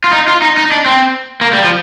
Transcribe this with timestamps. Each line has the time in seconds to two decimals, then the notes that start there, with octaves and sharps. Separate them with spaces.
0.04 F4
0.13 D#4
0.27 F4
0.42 D#4
0.57 D#4
0.72 D4
0.86 C4
1.41 A#3
1.53 G3
1.64 F3